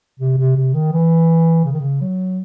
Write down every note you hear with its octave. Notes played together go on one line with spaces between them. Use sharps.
C3
C3
C3
D#3
E3
C#3
D#3
C#3
F#3